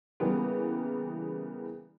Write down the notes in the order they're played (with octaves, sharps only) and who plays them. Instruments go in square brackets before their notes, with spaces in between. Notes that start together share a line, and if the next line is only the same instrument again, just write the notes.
[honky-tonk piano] C#3 E3 G3 A#3 B3